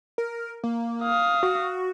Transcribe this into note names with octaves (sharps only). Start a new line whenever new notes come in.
A#4
A#3
F5 D#6
F#4